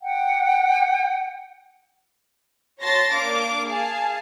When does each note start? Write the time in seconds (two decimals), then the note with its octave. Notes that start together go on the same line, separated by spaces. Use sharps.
0.01 F#5 G5
2.81 F#4 C#5 A5 C6 A6 A#6
3.13 A#3 D4 F5 D6
3.67 G#4 F5 G#5 A5